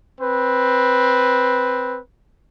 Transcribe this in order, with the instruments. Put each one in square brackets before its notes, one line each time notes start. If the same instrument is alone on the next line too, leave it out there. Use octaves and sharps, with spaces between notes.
[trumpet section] C4 B4